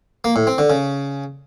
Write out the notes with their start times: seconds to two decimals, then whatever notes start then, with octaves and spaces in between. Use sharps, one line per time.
0.24 A#3
0.36 A2
0.47 C4
0.58 D3
0.70 C#3